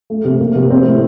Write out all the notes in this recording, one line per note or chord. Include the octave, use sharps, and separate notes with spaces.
A3
C3
A#3
C3
C4
A2